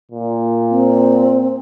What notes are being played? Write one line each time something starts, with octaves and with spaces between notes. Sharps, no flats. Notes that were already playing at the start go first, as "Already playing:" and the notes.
A#2
C4